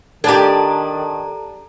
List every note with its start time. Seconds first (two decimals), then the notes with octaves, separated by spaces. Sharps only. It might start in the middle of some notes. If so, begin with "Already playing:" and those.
0.24 D#3 D4 G4 A4 A#5